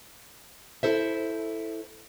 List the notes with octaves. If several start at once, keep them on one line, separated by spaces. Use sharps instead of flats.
E4 A4 C5 E5